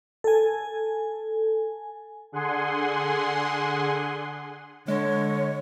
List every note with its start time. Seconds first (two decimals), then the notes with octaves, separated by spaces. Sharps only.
0.24 A4 G#5
2.32 D3 G#4 F#5 G#5 C6
4.88 D3 G#3 C#5